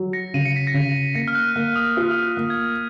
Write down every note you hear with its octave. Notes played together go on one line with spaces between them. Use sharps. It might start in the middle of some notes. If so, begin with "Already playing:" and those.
Already playing: F#3
A#6 C#7
C#3 D#7
C#7
B6
A#6 C#7
C#3
A#3 A#6 C#7
F6
F#6
A#3 F#6
D#6
F4 D#6
F6
D#6
F#6
A#3
G#6